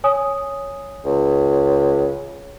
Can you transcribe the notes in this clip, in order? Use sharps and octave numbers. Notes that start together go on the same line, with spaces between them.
C#5 G#5 D#6
C#2